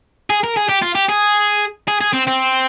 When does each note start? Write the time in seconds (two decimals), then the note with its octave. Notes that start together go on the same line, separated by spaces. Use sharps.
0.30 G#4
0.43 A#4
0.56 G#4
0.69 G4
0.82 F4
0.95 G4
1.09 G#4
1.88 G#4
2.01 G#4
2.14 C4
2.28 C4